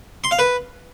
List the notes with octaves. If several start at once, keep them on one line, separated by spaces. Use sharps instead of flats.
C6
F5
B4